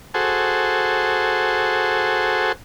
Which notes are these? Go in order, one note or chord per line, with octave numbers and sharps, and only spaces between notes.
F#4 G#4 A4 C5